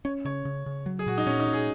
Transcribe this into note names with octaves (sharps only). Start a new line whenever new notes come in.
C#4 C#5
C#3 C#5
C#3
C#3
F#3
G#4
A#2 F#4
D#4
A#2 C#4
D#4
C#4
G#4